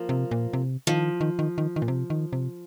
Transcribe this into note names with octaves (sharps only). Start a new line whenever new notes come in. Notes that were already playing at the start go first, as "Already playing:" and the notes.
Already playing: F3 A#3
C3
A#2
C3
D#3 F3
D#3
D#3
D#3
D#3
A#2
C3
D#3
C3